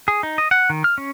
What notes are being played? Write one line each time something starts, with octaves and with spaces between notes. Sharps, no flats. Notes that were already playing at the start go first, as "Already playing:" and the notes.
G#4
D#4
D#5
F#5
D#3
F6
C#4